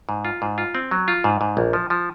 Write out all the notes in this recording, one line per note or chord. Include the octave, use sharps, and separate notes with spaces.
G#2
F4
G#2
F4
C4
F#3
F4
G#2
G#2
A#1
F3
F3